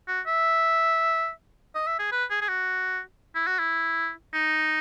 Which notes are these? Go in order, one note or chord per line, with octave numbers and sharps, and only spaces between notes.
F#4
E5
D#5
E5
G#4
B4
G#4
G#4
F#4
E4
F#4
E4
D#4